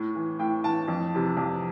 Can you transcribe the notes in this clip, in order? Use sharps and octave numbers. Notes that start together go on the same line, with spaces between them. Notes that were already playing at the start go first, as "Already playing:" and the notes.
Already playing: A2
E3
A2 G5
E3 A5
F2
C3 E3
F2